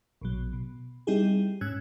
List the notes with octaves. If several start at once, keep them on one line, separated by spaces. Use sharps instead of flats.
A#1 B2 F#3
B2
G3 C4 D#4 E4 G4 G#4
G#2 C#4 E6 F#6 G#6